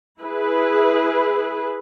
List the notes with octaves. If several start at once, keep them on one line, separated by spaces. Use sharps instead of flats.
E4 G#4 B4